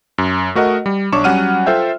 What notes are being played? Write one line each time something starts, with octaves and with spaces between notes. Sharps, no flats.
F#2
A3 F#4 A#4 D#5 F#5
G3
B1 D4 C#5 C#6 D6 E7
F#3 G3 C#4 F#5 F6 D#7
F4 A4 C5 E5 G5